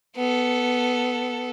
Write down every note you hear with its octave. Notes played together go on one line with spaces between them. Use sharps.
B3 A4